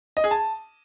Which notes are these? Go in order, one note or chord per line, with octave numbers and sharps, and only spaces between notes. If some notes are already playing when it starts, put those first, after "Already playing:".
D#5
G#4
A5